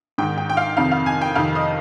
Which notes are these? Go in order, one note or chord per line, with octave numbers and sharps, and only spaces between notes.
G#2 D#3 G5
G5
G5
F5
F2 C3 D#3 F5
F5
G#5
G5
F2 C3 D#3 F5
D#5